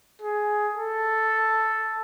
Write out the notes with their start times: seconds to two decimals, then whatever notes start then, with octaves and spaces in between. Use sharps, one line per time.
0.22 G#4
0.75 A4